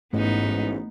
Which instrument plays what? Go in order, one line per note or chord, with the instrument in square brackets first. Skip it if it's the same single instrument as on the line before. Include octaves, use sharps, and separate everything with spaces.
[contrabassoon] A1 [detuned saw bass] G#2 [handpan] A3 [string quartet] B3 D#4